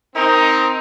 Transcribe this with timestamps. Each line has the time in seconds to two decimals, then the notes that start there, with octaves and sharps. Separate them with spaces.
0.15 C4 D#4 A#4